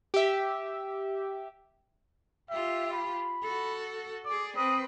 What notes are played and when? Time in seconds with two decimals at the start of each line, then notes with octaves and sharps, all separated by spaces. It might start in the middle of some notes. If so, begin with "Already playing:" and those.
0.14 G4 E5
2.50 F4 G4 E5
2.93 B5
3.42 F#4 A4
4.26 G#4 D5 D6
4.57 C4 B4 D#6